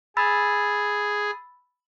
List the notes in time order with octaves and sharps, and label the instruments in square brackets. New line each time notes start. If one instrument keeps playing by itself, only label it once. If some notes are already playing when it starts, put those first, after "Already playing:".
[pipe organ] G#4 [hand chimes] B5 E6 A6